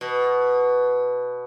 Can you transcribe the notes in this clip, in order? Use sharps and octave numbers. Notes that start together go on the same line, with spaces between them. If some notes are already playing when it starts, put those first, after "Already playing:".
B2